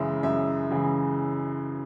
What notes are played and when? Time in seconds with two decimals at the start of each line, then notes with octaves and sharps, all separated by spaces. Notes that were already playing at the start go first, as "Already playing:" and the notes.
Already playing: F#2 C#3 E3 G#3 E5
0.23 F#2 E5
0.71 C#3 E3 G#3